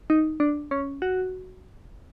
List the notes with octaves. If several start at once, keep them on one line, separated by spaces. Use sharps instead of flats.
D#4
D4
C#4
F#4